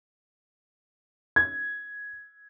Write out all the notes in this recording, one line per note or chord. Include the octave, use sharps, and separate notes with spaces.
G#6